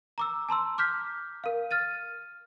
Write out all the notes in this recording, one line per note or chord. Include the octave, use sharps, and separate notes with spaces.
A#5 D6 E6
A5 A#5 C6 E6
D6 F6 G6 B6
A#4 F5
F6 A6 D#7